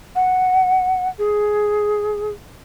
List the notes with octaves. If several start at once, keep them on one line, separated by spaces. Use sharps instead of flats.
F#5
G#4